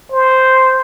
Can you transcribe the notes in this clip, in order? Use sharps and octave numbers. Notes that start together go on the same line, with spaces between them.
C5